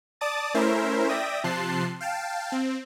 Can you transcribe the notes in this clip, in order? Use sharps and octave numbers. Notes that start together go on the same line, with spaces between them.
D5 A5 D6 D#6 A6
A3 C#4 E4 A#4 C5 E5
D5 E5 G5 D#6 A#6
C3 F3 A5 C6 F#6 C7
F5 G5 A5
C4